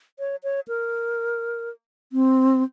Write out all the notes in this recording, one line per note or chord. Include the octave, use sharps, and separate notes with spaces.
C#5
C#5
A#4
C4